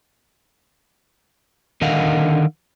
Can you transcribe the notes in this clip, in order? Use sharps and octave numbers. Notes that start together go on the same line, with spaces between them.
D3 D#3 A#4 D#5 F5 F#5